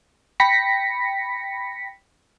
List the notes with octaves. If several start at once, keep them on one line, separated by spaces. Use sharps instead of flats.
G5 B5 A#6 B6 C#7